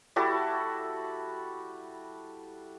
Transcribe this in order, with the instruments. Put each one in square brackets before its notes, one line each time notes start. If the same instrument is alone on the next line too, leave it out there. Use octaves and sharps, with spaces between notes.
[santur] G3 E4 F#4 A4